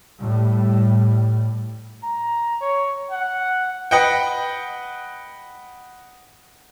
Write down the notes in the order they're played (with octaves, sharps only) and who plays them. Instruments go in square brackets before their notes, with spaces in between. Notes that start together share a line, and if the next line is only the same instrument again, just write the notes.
[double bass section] A2 G3
[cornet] A#5
C#5
F#5
[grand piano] B4 D#5 F#5 G5